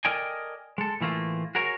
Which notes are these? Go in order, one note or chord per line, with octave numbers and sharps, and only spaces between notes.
A4 A#4 D5 D#5 G5 G#5
G#3 A4
A2 E3 A3 A#3 F4
F#4 G#4 A#4 C#5